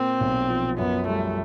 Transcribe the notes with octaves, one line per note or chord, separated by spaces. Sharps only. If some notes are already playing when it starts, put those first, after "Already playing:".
Already playing: A#2 A#3 C4
B1
F3
F#2 B3
G3 A3